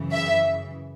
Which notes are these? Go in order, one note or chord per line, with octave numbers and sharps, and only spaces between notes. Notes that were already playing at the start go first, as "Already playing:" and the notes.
Already playing: F#2 C#3 E3
E5